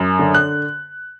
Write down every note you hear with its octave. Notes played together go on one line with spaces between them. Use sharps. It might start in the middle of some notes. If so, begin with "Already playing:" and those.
Already playing: F#2
D3
F#6